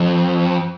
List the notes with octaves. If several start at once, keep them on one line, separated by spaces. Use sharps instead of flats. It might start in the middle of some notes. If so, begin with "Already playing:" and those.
Already playing: F2